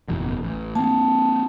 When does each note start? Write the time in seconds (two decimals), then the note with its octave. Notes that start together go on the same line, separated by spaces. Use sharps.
0.08 F#1 E2 B2
0.43 A1
0.75 A#3 C4 A5